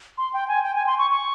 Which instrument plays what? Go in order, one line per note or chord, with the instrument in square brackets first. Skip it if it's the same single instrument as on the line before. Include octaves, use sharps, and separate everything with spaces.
[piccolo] C6
G5
G#5
G5
G#5
C6
C#6
C#6